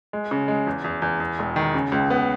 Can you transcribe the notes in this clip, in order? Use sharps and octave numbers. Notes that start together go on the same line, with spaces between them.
G#3
C#3
G#3
E2
E2
E2
E2
E1
D#3
C#3
C#2
B3